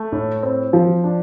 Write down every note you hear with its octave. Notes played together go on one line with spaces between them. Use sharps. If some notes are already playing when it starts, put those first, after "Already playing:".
Already playing: A3
A2
C4
F3
D4